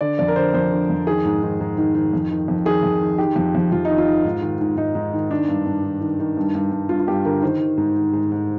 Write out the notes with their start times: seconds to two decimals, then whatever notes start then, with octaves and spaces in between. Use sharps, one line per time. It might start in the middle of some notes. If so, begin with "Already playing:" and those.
0.01 D3 D5
0.19 F2 D5
0.28 A#4
0.36 D3 C5
0.54 F2 C5
0.72 D3
0.90 F2
1.07 D#3 G#4
1.25 G#2
1.43 D#3
1.61 G#2
1.78 D#3
1.95 D#3
2.13 F2
2.31 D#3
2.48 F2
2.65 D#3 G#4
2.83 F2
3.01 D#3
3.18 D#3 G4
3.36 F2
3.55 F2
3.72 F2 F4
3.85 D#3 D#4
3.98 F4
4.07 D#3
4.25 G#2
4.42 D#3
4.61 G#2
4.77 G#2 D#4
4.95 G#2
5.14 D#3
5.30 D#3 D4
5.48 G2
5.66 G2
5.84 D#3
6.01 D#3
6.20 D#3
6.37 G2
6.55 G2
6.72 G2
6.89 G2 F4
7.00 F4
7.08 G2 G4
7.25 D3 A#4
7.42 D#3 C5
7.60 D#3
7.78 G#2
7.96 D#3
8.13 G#2
8.32 G#2